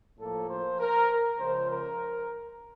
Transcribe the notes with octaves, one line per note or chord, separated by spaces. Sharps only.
A2 F3 A#3 A4
C5
A#4
C#2 C#3 F3 C5
A#4